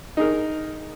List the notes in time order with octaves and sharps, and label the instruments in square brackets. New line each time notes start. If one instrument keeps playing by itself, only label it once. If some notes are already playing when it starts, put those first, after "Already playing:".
[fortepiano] D#4 G#4 A#4